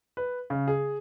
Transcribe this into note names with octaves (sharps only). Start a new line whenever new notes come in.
B4
C#3
G#4